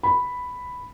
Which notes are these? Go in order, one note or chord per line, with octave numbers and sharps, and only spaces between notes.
B5